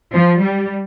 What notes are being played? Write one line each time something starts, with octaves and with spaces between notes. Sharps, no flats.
F3
G3